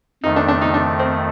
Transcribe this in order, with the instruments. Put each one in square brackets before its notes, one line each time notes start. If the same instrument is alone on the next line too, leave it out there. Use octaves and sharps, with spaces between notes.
[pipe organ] F2 D#3 A3 [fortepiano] D#4
[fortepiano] D4
D4
D#4
D4
C4